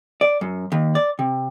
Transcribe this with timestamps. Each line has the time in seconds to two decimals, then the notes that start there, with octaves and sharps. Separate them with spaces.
0.21 D5
0.41 F#2
0.72 D#2
0.95 D5
1.19 C3